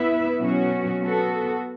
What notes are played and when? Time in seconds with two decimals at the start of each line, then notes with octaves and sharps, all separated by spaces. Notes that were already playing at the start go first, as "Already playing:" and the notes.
Already playing: B3 E4 B4 E5
0.40 B2 F#3 C#4 F#4
1.02 B3 F#4 A4